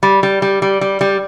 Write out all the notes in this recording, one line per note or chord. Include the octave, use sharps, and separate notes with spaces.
G3
G3
G3
G3
G3
G3